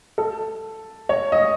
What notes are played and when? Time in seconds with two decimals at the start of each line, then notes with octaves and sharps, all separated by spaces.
0.18 A4
1.09 C#5
1.32 D#5